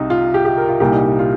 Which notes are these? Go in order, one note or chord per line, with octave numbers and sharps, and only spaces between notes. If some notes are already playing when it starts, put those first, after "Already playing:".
Already playing: C2 C3 D#4
F4
G4
G4
A#4
F4
C2 A#2 G3 G4
D#4
D#4
F4